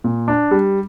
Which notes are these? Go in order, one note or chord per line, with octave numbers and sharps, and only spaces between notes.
A#2
D4
G3